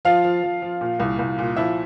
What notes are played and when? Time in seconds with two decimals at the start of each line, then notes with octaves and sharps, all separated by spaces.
0.05 F3 F4 F5
0.24 F3
0.43 F3
0.62 F3
0.81 A#2
1.00 C2
1.19 C2
1.38 A#2
1.57 F3 E4 E5